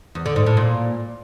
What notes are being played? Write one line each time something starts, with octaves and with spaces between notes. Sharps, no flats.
E2
D3
G#2
A2
A#2